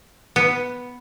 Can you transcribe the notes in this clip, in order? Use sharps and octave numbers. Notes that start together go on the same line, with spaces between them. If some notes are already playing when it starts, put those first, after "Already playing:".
B3